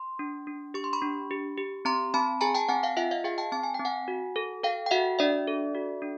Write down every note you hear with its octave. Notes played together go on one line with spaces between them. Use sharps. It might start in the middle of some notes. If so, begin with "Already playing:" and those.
Already playing: C6
D4
D4
G4 C#6
C6
B5 C#6
D4
G4
G4
C4 A#5 C6
C4 A5 B5
G#4 G#5 A#5
G5 A5
C4 F#5 G#5
F5 G5
F4 E5 F#5
D#5 F5
G#4 F5 G5
G5 A5
C4 A5
G#5
G5
C4
F#5 G#5
F#4
A4
A4 F5 G5
G5
F#4 E5 F#5
D4 D5 E5
A4
F#4
D4